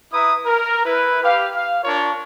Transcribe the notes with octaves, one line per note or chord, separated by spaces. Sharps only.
E4 B4 E5 A#5 D#6
A#4
E4 B4
G4 F5
F5
D4 F4 A#4 C#5